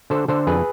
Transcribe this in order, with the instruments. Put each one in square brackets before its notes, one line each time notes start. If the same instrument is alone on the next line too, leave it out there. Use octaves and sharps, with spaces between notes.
[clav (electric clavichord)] D3 A4 C5
D3 A4 C5
F2 G#4 B4